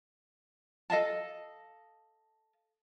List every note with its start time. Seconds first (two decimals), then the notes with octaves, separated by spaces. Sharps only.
0.90 A4 D#5 F5 A5